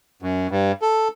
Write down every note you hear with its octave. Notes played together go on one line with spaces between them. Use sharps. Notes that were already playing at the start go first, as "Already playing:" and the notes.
F#2
G2
A4